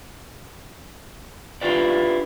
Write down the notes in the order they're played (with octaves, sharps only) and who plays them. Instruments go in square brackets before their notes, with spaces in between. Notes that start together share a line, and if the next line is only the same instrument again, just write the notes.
[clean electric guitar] D4 E4 F4 G4 B4 D5